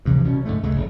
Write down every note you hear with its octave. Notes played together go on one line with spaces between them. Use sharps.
G2 C3 E3 F3
C2 B2 C#4
G#2 D3 A3
C#2 C#3 G#3 A3
F1